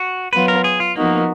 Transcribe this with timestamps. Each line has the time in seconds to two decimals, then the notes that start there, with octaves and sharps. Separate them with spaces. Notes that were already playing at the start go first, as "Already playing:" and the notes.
Already playing: F#4
0.33 F#3 B3 F4 B4
0.48 A#4
0.64 G#4
0.80 F4
0.96 F3 A#3 B3 D#4 F#4 A#4